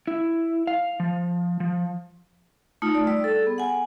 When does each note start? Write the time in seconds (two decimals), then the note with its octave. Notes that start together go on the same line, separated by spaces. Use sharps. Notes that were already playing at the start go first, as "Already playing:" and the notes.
0.08 E4
0.67 F5
1.00 F3
1.60 F3
2.82 A3 D#4 F4
2.94 D5
3.07 G3 D5 E6
3.24 A4
3.43 B3 G#4
3.58 F#5 G#5